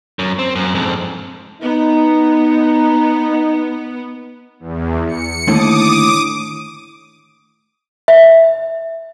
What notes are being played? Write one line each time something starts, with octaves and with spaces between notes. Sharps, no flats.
F#2
C4
F#2
F2 G#2
B3 D#4
E2
C#7
D#2 A2 D3 D6 D#6
E5